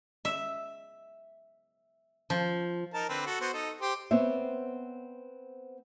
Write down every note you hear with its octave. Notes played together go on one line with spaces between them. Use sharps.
E5
F3
D#4 A#4 A5
D3 C4 B4
F#4 A4
B3 F#4 C5
D#4 A4
G4 C5
B3 C4 C5 C#5 E5